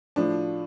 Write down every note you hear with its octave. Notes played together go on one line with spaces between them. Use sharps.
A2 F3 D4